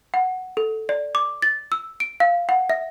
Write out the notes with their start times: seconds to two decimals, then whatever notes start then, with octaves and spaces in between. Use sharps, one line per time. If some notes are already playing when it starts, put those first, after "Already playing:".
0.14 F#5
0.57 A4
0.89 D5
1.15 D6
1.42 A6
1.72 E6
2.00 D7
2.20 F5
2.49 F#5
2.70 E5